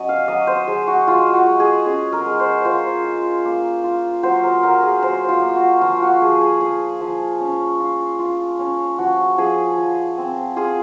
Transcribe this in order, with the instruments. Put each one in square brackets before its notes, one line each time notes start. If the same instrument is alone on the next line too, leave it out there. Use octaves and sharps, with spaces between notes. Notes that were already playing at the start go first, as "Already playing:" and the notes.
Already playing: [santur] F#3 C#4 D#5
F5
F#3 D#5
C5
F#3 G#4
F#4
G#3 F4
F#4
G#3
G#4
C#4 G#4
A#4
G#3
C5
F4 C5
F4
A#3
F4
F#3 C5
A#4
F#3 A#4
G#4
F#3 C5
F4
A#3
F#4
F3 F4
F#4
F3 G#4
G#4
F3 G#4
F3
C#4
F4
F4
C#4
F3 F#4
F3 G#4
F3
C4
F4 G#4